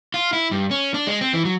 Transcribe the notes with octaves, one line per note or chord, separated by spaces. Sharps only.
F4
E4
G2
C#4
D4
G#3
C4
E3
F#3